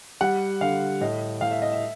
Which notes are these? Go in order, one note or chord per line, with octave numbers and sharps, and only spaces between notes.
G3 F#5
D3 F5
A2 D#5
A2 F5
E5
D#5
E5